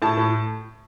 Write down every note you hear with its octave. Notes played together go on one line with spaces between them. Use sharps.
A2 A5
A2